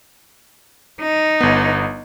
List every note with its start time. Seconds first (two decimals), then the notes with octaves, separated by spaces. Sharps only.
1.01 D#4
1.41 G1 B3